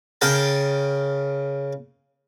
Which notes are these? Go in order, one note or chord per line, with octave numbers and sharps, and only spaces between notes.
C#3 A#4 G5 A5